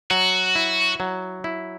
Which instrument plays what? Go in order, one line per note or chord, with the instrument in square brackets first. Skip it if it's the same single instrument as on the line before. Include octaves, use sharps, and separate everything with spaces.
[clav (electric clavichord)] F#3 [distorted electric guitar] F#4
[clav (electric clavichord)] E4
F#3
E4